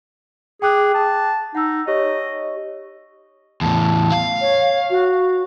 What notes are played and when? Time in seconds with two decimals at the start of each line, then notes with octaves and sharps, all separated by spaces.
0.62 G#4 G5 D6 F#6
0.95 A5
1.55 D#4 F#5 E6
1.87 G4 C#5 D#5 C#6
3.61 E2 A2 A5
4.12 F5
4.41 C#5
4.90 F#4